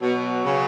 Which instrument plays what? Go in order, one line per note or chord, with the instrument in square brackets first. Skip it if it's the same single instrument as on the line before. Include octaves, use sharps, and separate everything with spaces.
[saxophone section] B2 [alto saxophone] F#3
[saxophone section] C#3